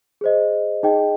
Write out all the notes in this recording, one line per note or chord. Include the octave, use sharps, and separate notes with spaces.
G#4 C5 D#5
D#4 G#4 D#5 G5